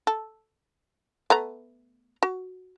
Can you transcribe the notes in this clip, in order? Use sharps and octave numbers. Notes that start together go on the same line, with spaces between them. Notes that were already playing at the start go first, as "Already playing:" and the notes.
A4
A3 B3 A#5
F#4